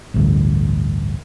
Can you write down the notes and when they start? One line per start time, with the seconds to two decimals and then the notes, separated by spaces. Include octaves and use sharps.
0.14 A1 D2 G2